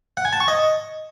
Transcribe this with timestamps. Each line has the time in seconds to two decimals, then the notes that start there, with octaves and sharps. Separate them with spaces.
0.17 F#5
0.25 G#5
0.33 A5
0.40 C#6
0.48 D#5